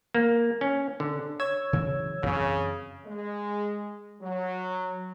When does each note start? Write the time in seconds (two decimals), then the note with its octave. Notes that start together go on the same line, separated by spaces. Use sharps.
0.15 A#3
0.61 C#4
1.00 D3
1.40 C#5 E6 G#6
1.73 C#3 E3 F#3
2.23 F#2 C#3 E3 C4
3.06 G#3
4.22 F#3